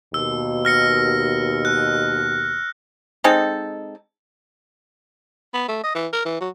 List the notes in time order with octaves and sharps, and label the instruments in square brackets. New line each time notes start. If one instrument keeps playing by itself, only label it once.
[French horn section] D#2 B2 [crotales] E6
[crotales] F6 A#6 C#7
F#6
[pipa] G#3 C4 D#4 A4
[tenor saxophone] B3
A3
D#5
E3
A#4
E3
F#3